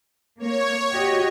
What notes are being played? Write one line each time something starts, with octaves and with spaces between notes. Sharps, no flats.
A#3 C#5
F#4 G4 D#5